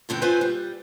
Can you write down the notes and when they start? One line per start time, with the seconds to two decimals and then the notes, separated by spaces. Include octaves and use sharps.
0.09 G2 D3 C4 G5
0.22 C4 F4 B4 C5 G#5
0.41 G3